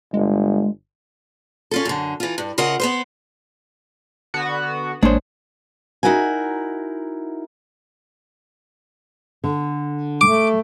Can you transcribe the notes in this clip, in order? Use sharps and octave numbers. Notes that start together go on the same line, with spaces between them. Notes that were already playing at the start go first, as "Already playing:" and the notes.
G1 G#3
C#4 F4 A4
F#2 D3
E3 F4
G2
C#3 F4 A#4 D#5 F#5
B3 B4 C5
D3 B3 F#4
A1 G#3 A#3 D4 C5 C#5
D#4 E4 F#4 A#4 G#5
D3
A3 D6